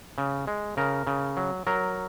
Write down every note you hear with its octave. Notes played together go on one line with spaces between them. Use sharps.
C#3
G#3
C#3 A#4
C#3
F#3
F#3 A#4